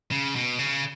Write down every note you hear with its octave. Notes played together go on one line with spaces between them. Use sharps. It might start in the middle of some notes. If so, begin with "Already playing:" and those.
C#3
B2
C#3